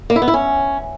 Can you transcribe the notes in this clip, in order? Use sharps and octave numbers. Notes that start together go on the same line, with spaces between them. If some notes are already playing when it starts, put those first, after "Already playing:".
A#3
E4
B3
E4
C#4